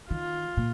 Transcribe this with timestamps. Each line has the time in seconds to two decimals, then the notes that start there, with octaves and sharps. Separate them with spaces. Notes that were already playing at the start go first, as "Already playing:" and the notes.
0.10 D#3 F4
0.57 A#2